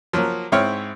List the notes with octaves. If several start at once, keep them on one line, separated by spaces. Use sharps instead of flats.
F3 F#3 A#3
G#2 C4 E4 C#5 F6